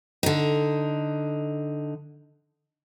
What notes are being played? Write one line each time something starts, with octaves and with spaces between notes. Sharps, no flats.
D3 D#4